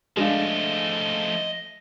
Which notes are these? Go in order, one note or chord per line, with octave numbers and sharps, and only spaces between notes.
F3 G#3 A3 D4 D#5 F5